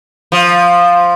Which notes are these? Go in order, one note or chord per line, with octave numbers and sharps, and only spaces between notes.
F3